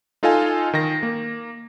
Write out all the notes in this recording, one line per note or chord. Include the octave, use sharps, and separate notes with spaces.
D#4 F4 A4 D#5 F5 G#5
D#3 A#6
A#3